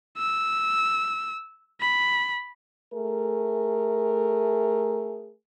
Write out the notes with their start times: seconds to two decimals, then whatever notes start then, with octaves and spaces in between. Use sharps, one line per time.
0.17 E6
1.81 B5
2.94 A3 G#4 A#4